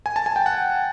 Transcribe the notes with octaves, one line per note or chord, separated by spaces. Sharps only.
G#5
A5
G#5
G5
F#5